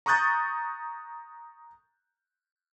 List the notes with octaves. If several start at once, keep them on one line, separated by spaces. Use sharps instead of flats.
A#5 C#6 D#6 F#6 G6 A6